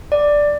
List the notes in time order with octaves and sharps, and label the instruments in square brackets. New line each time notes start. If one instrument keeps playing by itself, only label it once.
[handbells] D5